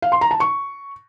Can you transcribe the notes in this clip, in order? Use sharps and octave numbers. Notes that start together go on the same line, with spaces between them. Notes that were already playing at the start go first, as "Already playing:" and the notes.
F5
C6
A#5
A5
C#6